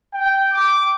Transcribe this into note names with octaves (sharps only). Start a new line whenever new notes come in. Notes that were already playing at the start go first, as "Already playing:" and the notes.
G5
D6